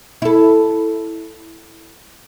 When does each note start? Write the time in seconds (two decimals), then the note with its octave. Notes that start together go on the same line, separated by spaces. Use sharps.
0.22 E4 A4